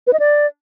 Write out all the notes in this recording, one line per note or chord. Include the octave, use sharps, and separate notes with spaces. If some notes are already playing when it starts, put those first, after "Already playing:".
B4
D#5
D5